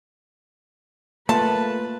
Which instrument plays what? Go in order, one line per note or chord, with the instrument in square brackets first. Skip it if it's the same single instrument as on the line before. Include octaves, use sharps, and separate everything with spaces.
[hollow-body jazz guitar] A3 F4 [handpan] A#3 [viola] B4 [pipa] A5